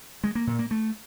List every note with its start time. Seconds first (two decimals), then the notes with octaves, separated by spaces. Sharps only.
0.24 G#3
0.35 A#3
0.47 A#2
0.59 A#3
0.71 A3